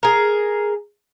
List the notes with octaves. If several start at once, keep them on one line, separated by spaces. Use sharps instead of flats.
G#4 A#4